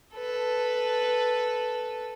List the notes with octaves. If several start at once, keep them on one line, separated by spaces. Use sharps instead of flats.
A4 B4